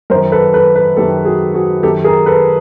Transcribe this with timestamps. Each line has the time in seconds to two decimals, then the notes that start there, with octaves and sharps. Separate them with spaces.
0.10 F#2 A#4 C5
0.14 D#3
0.32 A4 B4
0.54 A4 B4
0.76 A4 B4
0.96 F#2 D#3 G4 A4
1.25 F#4 G#4
1.54 F#4 G#4
1.83 F#2 D#3 G4 A4
2.04 G#4 A#4
2.26 A4 B4